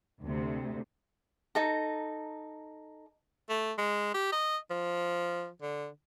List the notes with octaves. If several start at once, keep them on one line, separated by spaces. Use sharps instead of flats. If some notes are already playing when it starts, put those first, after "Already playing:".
D2 C3
D#4 A4 A#5
A3
G#3
G4
D#5
F3
D3